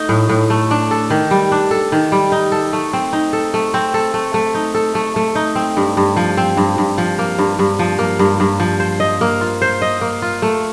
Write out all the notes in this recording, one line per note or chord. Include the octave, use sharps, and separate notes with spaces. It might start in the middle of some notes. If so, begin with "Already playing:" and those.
Already playing: A3 D#4
A2
A2
A3
D4
A4
D#3
G3
D4
A4
D#3
G3
D#4
A4
A3
C4
D#4
A4
A3
C4
A4
A3
A3
D#4
A4
A3
A3
D#4
C4
G2
G2
F3
C4
G2
G2
F3
A#3
G2
G2
F3
A#3
G2
G2
F3
C5
D#5
A#3
F4
C5
D#5
A#3
F4
A3